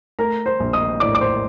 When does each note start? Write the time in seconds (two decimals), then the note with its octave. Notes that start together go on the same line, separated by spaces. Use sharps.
0.19 A3 A#4 A#5
0.46 C5 C6
0.60 A#1
0.73 D#5 D#6
1.00 A2 D5 D6
1.15 D6
1.21 C5 C6